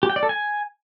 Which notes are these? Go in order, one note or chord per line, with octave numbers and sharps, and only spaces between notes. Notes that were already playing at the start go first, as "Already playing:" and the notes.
G4
G5
D5
A4
G#5